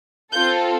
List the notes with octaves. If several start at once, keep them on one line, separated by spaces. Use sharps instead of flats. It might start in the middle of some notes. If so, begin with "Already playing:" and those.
C4 F4 A4 G6